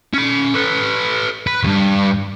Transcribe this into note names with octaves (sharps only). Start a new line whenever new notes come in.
C#4 B5
A4 B4
B4
D2 G2